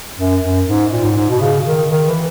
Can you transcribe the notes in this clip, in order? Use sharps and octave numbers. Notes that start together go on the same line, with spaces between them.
F#2
F#2
G#2
A#2
G#2
G#2
B2
C#3
D#3
D#3
E3